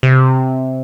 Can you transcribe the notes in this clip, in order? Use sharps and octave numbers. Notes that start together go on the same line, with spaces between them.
C3